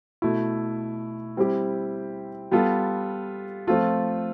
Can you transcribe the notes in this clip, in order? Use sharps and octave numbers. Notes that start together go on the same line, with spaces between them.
B2 A3 E4
G3 C4 E4 G4
G3 B3 F4 A4
F3 A3 C4 F4 A4